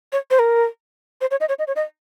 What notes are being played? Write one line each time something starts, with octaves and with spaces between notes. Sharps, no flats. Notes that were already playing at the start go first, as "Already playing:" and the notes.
C#5
C5
A#4
C5
C#5
D#5
C#5
D#5
C#5
D#5